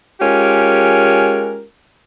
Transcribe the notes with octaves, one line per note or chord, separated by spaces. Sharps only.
G#3 C#4 F4 G4 A#4